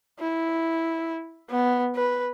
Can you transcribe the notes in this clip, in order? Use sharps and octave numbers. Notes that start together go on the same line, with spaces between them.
E4
B3
B4